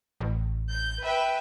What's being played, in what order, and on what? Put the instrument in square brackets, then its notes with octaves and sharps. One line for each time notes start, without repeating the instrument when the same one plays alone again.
[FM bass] A1
[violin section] G6
B4 E5 G5